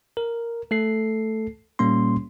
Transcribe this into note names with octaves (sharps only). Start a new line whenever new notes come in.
A#4
A3 A4 C7
A#2 G3 A#3 C#4 C6